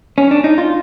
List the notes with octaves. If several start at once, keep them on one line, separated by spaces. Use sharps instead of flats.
C#4
D4
D#4
F4